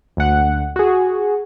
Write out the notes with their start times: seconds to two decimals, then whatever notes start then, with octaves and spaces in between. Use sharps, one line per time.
0.17 D2 F#5
0.76 F#4 G#4